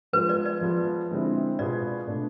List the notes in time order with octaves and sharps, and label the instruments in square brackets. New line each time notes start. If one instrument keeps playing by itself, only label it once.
[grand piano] F3 G#3 B3 F4 G#4 [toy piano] B4
[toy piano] D5
D5
[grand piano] F3 B3 F4 G#4
D3 G#3 C4 E4
[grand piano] B2 B3 F4 G#4 [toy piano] D5
[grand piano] B2 A3 D4